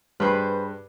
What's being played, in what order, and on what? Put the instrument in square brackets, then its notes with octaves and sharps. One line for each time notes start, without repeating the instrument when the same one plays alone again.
[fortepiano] G2 [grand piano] G#4 B5 [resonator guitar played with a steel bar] B4 C5